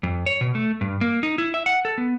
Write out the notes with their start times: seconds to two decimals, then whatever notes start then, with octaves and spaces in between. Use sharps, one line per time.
0.03 F2
0.26 C#5
0.41 B2
0.55 A3
0.81 G2
1.01 A#3
1.23 D#4
1.38 E4
1.54 E5
1.66 F#5
1.85 A4
1.98 B3